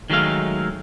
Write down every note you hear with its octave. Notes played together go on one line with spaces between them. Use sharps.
D#3 F#3 G#3 A3 F5